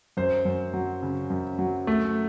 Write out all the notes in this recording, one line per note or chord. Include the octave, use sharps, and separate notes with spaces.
F#2 C5
F#2
F#3
C#3
F#2
F#3
A3